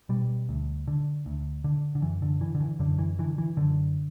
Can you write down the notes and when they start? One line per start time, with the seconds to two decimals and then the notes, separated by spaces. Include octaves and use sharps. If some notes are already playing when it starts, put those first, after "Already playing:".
0.09 B2 G3
0.49 D2
0.88 D3
1.26 D2
1.64 D3
1.95 D3
2.02 F#2 E3
2.22 D3
2.41 D3 E3
2.55 D3
2.60 E3
2.79 F#2 D3
2.99 E3
3.19 D3 E3
3.38 E3
3.57 F#2 D3